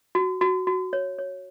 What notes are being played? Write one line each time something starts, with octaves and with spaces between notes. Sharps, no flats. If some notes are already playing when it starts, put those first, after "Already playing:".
F#4
F#4
F#4
C#5
C#5